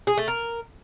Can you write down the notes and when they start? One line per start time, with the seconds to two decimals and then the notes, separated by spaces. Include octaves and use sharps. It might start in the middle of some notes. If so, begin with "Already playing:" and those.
0.07 G#4
0.17 A3
0.28 A#4